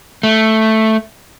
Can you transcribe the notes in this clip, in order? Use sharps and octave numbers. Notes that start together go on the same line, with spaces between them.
A3